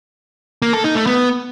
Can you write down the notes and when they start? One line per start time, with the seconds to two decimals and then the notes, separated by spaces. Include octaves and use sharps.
0.62 A#3
0.73 A4
0.84 D#4
0.95 A3
1.06 B3